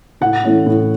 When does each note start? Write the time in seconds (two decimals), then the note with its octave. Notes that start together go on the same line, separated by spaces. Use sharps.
0.21 A2 F#5
0.44 E3 A3 C#4 E4
0.66 A2